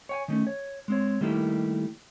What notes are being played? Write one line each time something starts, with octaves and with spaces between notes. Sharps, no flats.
C#5 G5 G#5
D#3 A3 C#4
C#5
G#3 C4 C#5
D#3 G3 A3 A#3 E4 G4